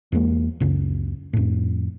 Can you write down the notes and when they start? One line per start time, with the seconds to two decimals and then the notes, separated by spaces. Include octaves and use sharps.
0.12 E2 G#3 A#3
0.60 C#2 F#2 C#3
1.33 F2 A2